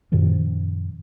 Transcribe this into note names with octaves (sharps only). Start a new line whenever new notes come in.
F#2 A#2 D#3 F3